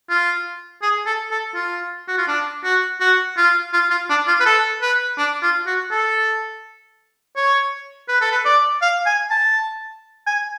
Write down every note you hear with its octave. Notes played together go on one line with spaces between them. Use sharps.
F4
G#4
A4
A4
F4
F#4
F4
D4
F#4
F#4
F4
F4
F4
D4
F4
B4
A4
B4
D4
F4
F#4
A4
C#5
B4
A4
B4
D5
F5
G#5
A5
G#5